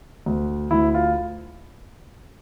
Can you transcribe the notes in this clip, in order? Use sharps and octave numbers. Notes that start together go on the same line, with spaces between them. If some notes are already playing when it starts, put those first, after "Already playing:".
D2
D2 E4
F4